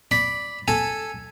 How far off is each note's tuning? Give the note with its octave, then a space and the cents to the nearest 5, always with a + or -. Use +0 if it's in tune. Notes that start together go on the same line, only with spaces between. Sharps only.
D5 +0 B5 +0
A4 +0 G#5 +0